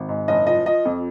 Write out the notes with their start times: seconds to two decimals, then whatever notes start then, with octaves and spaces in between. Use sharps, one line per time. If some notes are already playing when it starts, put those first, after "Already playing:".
Already playing: G#1
0.09 G#2
0.28 F#1 D#5
0.47 F3 D#5
0.65 F3 D#5
0.85 F2